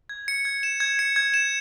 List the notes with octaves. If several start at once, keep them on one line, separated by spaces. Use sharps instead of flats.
G#6
C#7
G#6
E7
G#6
C#7
G#6
E7